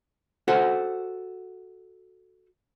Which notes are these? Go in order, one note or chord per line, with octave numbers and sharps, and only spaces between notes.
F#4 A4 C5 F#5